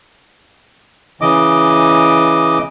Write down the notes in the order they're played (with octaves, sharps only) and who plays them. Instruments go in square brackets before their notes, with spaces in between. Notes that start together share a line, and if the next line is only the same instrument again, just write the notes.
[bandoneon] C#3 E3 D#5 D6